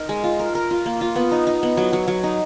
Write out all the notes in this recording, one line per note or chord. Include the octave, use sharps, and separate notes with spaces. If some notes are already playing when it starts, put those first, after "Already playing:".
Already playing: D#4 A#4
G#3
F4
A#4
A#4
F4
A#3
F4
B3
D#4
D#4
B3
F#3
F#3
F#3
D#4